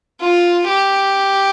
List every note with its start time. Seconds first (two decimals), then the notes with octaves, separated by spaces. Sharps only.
0.21 F4
0.68 G4